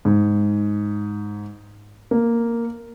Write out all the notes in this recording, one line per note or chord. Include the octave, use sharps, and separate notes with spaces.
G#2
A#3